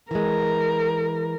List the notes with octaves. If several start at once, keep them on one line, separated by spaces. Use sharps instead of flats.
E3 G#3 A#4